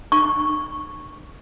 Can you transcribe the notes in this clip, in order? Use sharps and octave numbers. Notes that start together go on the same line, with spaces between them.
C#6